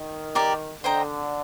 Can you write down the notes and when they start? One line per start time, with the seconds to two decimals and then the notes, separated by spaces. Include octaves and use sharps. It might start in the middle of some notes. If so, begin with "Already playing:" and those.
Already playing: D#3
0.35 G4 A#4 D5
0.84 D3 C5 D#5 G5 A#5